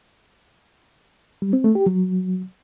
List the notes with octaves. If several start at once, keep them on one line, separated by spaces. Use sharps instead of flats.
G3
C4
A3
G4
F#3